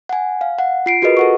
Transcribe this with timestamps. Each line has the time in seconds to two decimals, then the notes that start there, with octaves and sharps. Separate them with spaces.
0.09 F#5 G#5
0.41 F5
0.59 F#5
0.86 F4 C7 D7
1.02 F4 F#4 G#4 A#4 B4 D#5
1.17 A4 F#5 C#6